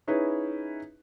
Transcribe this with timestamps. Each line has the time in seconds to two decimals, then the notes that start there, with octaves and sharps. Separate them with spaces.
0.07 C#4 D#4 E4 G#4 B4